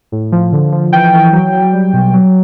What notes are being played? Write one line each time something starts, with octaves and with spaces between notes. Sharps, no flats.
A2
F3
D3
F3
E3 G5
E3
F#3
F#3
G3
B2
F#3